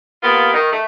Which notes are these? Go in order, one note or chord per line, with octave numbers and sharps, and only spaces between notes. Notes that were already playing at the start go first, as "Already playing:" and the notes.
A#3 B3 F4 G4
D#3
A3